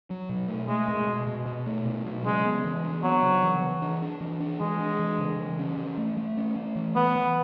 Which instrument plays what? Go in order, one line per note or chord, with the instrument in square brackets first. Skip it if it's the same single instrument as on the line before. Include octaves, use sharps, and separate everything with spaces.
[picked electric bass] F#3
B2
A3
[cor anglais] G#3 [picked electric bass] A3
[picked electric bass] B2
B2
B2
B2
A3
B2
F#3
[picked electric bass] C#3 [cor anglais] G#3
[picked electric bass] B3
E3
D4
[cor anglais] F#3 [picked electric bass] B3
[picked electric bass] C#3
E3
E3
D4
D4
E3
D4
[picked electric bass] E3 [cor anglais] G#3
[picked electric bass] D4
E3
C#3
E3
C#4
E3
A3
A3
C#4
A3
E3
[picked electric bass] E3 [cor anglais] B3
[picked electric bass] E3